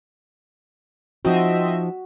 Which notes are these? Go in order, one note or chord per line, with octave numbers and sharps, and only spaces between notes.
F3 C4 D#4 F#4 D#5 E5